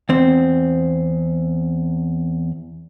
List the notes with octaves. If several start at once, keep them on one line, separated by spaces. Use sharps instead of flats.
E2 C4